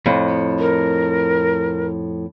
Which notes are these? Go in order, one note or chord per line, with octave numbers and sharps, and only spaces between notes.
F2 A2
A#4